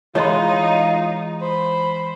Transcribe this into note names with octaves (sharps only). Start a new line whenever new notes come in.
E3 G#3 D#4 F4 C#5 D#5 C6
C5 B5